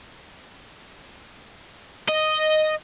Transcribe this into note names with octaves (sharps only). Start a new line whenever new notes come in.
D#5